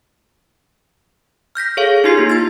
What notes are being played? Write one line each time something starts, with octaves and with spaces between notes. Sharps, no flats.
F6 G6 A#6 B6
G#4 A4 C#5 F5
D#4 F4 G4 C6 C7
A#3 E4 F4
G#6 A6